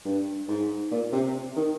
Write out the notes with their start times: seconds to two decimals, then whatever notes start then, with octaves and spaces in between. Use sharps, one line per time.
0.05 G2
0.48 G#2
0.91 A#2
1.13 C3
1.56 D#3